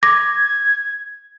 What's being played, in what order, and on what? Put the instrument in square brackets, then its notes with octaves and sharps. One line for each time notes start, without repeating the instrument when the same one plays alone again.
[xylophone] D6 A#6 [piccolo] G#6